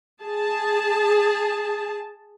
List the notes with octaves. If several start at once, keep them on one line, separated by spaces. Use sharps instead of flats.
G#4 A5